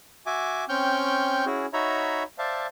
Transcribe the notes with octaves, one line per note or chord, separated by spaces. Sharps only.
F#4 E5 G#5 D6
C4 C#4 G5 C#6 F6 G6
C#4 E4 F#4 G#4
D#4 F#4 C#5 E5 A#5 B5
C5 D5 E5 F5 A5